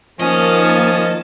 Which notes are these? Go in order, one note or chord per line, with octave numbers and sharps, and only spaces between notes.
D#3 F3 A#3 C#4 D#5 A5